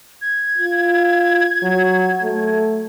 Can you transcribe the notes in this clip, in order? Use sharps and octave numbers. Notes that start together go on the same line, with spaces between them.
G#6
F4
F#3
A3